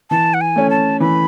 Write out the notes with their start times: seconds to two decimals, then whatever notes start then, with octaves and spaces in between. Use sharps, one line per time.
0.10 E3 A5
0.34 F#5
0.41 G#5
0.56 A3 C#4
0.70 A5
1.00 E3 B5